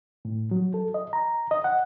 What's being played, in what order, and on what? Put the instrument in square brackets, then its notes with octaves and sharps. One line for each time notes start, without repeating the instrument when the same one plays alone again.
[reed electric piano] A2
F#3
A4
D#5
A#5
D#5
F#5